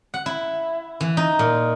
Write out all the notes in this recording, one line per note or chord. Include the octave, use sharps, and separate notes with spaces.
F#5
E4
E3
D#4
A#2